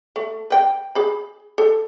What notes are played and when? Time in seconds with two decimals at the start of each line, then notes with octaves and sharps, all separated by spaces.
0.16 A3
0.50 B4 G5
0.95 G#4 B5
1.58 A4